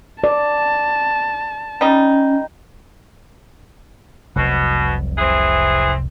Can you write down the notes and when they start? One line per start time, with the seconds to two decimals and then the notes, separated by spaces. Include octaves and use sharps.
0.24 D5 A5
1.81 G3 C#4 D#4
4.36 F1 C2 B2 F#3
5.18 E3 C4 G#4